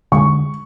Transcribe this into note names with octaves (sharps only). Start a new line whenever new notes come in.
D3 G#3 C#6